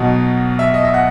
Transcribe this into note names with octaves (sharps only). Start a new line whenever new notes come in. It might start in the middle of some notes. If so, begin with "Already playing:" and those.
Already playing: B1 B2 F#3 D#5
E5
D#5
E5
F#5